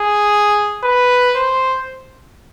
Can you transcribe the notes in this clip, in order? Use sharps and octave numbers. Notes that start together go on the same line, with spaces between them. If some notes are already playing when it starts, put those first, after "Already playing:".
Already playing: G#4
B4
C5